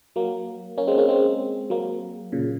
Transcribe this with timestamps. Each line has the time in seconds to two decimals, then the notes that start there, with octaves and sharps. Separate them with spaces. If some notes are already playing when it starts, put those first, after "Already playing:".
0.16 F#3 A#3
0.78 A#3 C#4
0.87 G#3 C4
0.98 A#3 C#4
1.08 G#3 C4
1.70 F#3 A#3
2.32 A#2 C#3